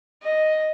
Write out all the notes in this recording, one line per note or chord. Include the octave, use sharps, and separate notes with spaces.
D#5